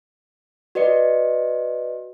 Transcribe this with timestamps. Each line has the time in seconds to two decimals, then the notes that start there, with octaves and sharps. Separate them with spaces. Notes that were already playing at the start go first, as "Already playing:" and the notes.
0.75 F#4 B4 D5 D#5 C#7